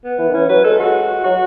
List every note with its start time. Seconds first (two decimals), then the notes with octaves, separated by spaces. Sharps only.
0.04 B3
0.18 E3
0.29 D#3
0.33 E3 C#4
0.49 F#3 B4
0.64 G#3 A4
0.79 F#4
1.24 F#3 F#4